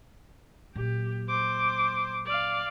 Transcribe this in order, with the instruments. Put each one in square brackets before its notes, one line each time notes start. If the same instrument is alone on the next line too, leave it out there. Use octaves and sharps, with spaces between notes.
[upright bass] A#2 F#3 [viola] G4
[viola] C5 D6
D5 F5